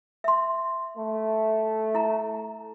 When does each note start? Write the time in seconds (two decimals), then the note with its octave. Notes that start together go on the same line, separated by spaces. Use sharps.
0.24 E5 C6
0.97 A3
1.95 E4 A#5